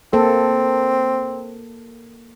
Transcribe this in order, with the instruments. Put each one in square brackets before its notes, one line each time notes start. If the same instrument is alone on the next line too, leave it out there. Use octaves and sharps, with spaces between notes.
[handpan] A#3 A4 [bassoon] C4